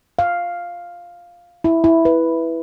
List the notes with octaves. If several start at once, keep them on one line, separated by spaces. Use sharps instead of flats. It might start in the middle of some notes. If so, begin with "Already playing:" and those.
F5
E4
E4
B4